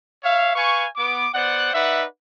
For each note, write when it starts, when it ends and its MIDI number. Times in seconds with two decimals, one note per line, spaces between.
0.24 0.55 73
0.24 0.55 76
0.24 0.55 77
0.55 0.87 71
0.55 0.87 77
0.55 0.87 80
0.55 0.87 85
0.96 1.27 59
0.96 1.27 86
1.34 1.72 59
1.34 1.72 72
1.34 1.72 74
1.34 1.72 78
1.73 2.05 63
1.73 2.05 71
1.73 2.05 74
1.73 2.05 76
1.73 2.05 78